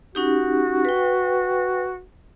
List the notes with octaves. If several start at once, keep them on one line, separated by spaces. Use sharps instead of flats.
C#4 D#4 F#4 G4
B4 G5